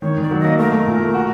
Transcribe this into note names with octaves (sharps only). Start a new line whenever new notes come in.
D#3 C#5
D#3 D5
F#3
D#5
A#3
A3 A#4
A3
A#2
A3
F#4